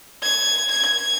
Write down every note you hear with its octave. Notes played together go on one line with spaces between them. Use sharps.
G#6
G#6